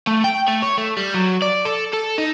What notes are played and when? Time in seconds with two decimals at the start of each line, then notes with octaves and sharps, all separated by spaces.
0.07 A3
0.24 G5
0.48 A3
0.62 C#5
0.78 A3
0.97 G3
1.14 F#3
1.42 D5
1.65 A4
1.93 A4
2.18 D#4